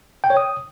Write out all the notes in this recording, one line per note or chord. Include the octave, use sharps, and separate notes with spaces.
G5
C#5
D#6